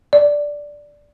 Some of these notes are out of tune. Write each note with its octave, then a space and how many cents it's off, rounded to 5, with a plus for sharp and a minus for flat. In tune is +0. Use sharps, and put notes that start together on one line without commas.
D5 -5